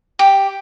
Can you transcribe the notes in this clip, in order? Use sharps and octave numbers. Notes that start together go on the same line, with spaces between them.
G4